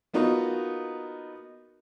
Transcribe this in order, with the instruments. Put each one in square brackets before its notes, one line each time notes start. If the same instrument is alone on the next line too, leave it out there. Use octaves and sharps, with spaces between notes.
[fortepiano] A#3 B3 D#4 F4 F#4